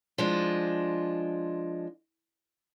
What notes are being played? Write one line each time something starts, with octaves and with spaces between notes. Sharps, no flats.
F3 G#3 D4